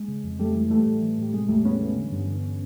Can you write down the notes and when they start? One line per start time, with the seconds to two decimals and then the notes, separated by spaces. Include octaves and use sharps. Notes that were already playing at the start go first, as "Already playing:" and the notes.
Already playing: G#3
0.08 C#3
0.24 F2
0.39 F2 G3 A3
0.55 E3
0.70 E3 G3 A3
0.86 A2
1.02 E3
1.18 A2 G3
1.34 C3 G#3
1.48 E2 G3 A3
1.65 E2 B3 C#4
1.80 E3
1.96 D3
2.12 G2
2.27 D3